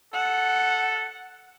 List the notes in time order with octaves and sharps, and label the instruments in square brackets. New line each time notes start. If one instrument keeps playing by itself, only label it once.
[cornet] A4 [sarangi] F#5